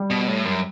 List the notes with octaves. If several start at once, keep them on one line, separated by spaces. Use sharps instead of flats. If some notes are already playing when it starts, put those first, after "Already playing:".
Already playing: G3
B2
A2
F#2